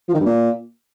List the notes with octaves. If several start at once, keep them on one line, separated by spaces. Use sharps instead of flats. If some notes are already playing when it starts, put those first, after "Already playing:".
F3
D#3
G2
A#2